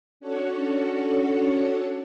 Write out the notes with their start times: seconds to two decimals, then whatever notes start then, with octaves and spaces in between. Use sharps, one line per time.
0.20 C#4 D4 F#4 A4 C#5 F#5